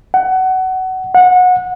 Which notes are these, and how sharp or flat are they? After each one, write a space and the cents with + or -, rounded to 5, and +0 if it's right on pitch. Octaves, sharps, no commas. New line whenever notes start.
F#5 +20
F#5 -25